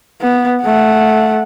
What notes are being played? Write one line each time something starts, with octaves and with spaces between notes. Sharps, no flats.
B3
A3 F#5